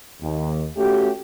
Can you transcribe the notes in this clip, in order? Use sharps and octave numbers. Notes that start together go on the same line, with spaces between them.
D#2
A3 C#4 F#4 G4